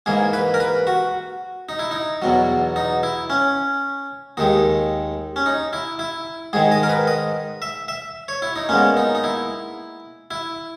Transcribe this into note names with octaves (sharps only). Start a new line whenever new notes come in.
G#2 E3 A#3 G#4
B4
A#4
B4
F#4
D#4
E4
D#4
E2 B2 F#3
D#4
E4
C#4
D#2 D#3 G#3 D#4
C#4
D#4
E4
E4
G#2 D#3 G#3 G#4
D#5
A#4
B4
D#5
E5
E5
C#5
E4
D#4
A#2 G#3 B3 C#4
D#4
D#4
E4
E4